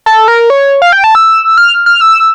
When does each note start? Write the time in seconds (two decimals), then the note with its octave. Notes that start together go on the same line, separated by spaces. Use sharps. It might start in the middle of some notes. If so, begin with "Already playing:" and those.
0.06 A4
0.28 A#4
0.50 C#5
0.82 F5
0.92 G5
1.04 A5
1.15 E6
1.58 F6
1.86 F6
2.01 E6